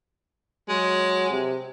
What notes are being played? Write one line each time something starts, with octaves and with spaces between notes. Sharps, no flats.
F#3 G#3
C3